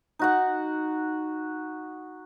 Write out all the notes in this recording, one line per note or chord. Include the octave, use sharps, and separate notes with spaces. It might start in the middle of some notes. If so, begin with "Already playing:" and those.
D#4 F#4 F#5